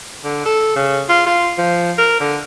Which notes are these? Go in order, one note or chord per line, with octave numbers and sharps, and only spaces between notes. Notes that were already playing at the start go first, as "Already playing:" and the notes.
D3
A4
C#3
F4
F4
F3
A#4
D3